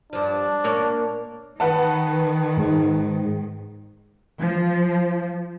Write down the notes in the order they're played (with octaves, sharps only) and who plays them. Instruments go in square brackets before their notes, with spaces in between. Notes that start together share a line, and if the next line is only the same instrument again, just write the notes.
[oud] G2 F3 [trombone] D4
[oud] A#2 A#3 C#5
[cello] D#3 [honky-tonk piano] B4 F#5 A5
[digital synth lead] G#2
[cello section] F3